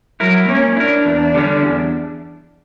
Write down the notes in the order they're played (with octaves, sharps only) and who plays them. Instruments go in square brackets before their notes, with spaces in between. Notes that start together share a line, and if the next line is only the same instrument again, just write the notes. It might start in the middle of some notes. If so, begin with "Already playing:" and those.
[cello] F#3 [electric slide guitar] E4 A#4
[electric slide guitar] A#3 [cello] C#4
[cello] D4 [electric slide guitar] E4 A#4
[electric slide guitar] E2
D3 G3 C#4
E2